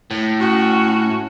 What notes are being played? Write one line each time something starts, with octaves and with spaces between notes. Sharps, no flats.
A2
C#4 F#4